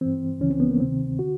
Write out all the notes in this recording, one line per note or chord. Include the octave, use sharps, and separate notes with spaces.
G2 E3 C4
C#2 C#3 E3 C#4
C4
B3
A#3
D2 C3 D#3 C4
D3 F#4